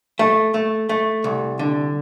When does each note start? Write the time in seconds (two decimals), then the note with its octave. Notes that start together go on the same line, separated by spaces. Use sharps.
0.19 A3
0.54 A3
0.89 A3
1.24 C2
1.59 D3